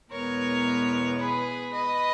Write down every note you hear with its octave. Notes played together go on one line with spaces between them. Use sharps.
E2 B2 G#3 B3 A#4 C#5
G#4 B4
B4 D#5